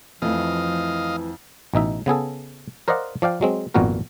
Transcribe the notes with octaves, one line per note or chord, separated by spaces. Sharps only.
F2 E3 F3 A3 D#5 F5
A1 B2 D#4 E5
C#3 B3 G#4 A4
A#4 C5 D5 D#5 F5 F#5
F3 D5 F5 G5
F#3 G#3 C4
G#1 F2 A#2 B3 F#4 A#4